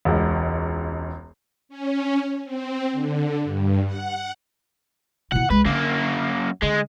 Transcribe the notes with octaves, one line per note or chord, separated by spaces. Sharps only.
E1 C#2
C#4
C4
D3
G2
F#5
B2 E4 F#5
C2 G#3 B4
F#2 D3 A#3
D3 G#3